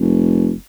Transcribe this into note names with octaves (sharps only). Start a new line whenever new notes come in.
F1